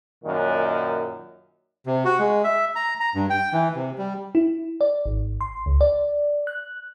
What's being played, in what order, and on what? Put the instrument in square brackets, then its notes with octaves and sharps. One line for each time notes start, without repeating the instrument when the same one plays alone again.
[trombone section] F#2 A#2 D#3
[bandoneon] C3
F#4
G#3
E5
A#5
A#5
G2
G5
E3
C3
G3
[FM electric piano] E4
D5
G#1
C6
C#2
D5
F#6